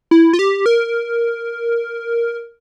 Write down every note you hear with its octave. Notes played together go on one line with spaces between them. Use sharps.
E4
F4
G4
A#4